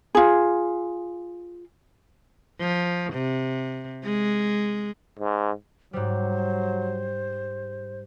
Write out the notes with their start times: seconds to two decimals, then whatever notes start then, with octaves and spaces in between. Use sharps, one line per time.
0.15 F4 G#4
2.60 F3
3.13 C3
4.05 G#3
5.19 G#2
5.93 G#2 F#3 G3 C5